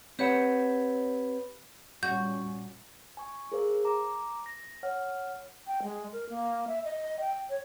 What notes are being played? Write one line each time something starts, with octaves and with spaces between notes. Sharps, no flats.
C4 G4 B4 C#5 F#5 B5
A#2 G3 C#4 F#4 G6
G#5 C#6
G#4 A#4 C5 F5
A#5 D6
A#6
C#5 F#5 F6
G5
G#3
A#4
A#3
E5
D#5
G5
C#5